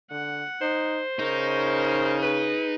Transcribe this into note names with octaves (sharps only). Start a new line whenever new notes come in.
D3 F#5
D#4 C5
C#3 D#4 A#4 C#5
G#4 B4